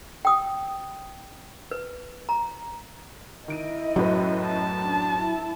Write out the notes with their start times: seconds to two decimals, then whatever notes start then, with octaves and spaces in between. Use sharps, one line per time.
0.25 G5 D#6
1.71 B4
2.29 A#5
3.48 D#3 E4 D#5 D7 D#7
3.96 F#2 A2 F#3 B4
4.45 A5
4.85 D4
5.18 E4